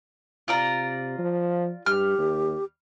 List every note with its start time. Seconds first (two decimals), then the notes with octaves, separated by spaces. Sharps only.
0.48 C3 F4 D5 A#5
1.18 F3
1.86 G2 G4 F6
2.18 D#2